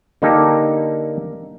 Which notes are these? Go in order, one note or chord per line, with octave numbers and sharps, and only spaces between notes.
D3 A#3 D#4 G4 A4